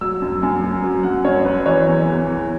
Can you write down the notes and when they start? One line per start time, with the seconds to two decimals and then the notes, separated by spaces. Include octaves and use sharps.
0.01 F#3 E6
0.22 F#2
0.42 F#2 G#5
0.63 F#3
0.84 F#3
1.03 F#2 F#5
1.24 F#2 C#5
1.45 F#3 B4
1.66 E3 C#5
1.87 E2
2.07 E2
2.27 E3